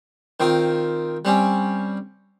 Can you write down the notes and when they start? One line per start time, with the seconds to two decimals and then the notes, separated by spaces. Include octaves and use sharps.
0.40 D#3 C4 F4
1.25 G3 C4 C#4